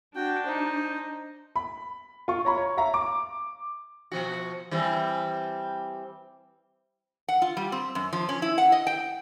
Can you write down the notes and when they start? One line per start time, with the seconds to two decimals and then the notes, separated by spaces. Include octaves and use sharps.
0.16 D4 F#4 G5
0.46 D#4 C5
1.56 B5
2.28 F4 C#6
2.45 C#5 A#5 B5
2.58 C#5
2.77 E5 F5 A#5
2.94 D6
4.12 B2 F3 F#4
4.71 E3 G3 C4
7.28 F#5
7.42 F4
7.57 G3
7.72 C4
7.95 F#2
8.13 F3
8.29 C#4
8.42 E4
8.58 F#5
8.72 D#5
8.87 G5